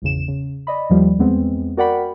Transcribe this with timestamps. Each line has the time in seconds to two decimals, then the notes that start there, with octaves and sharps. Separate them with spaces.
0.02 G#1 E2 C#3 E7
0.28 C#3
0.67 D5 D#5 B5
0.90 D#2 F3 G3
1.19 E2 G#3 B3 C4
1.77 F#4 A#4 D5 F#5 G5 B5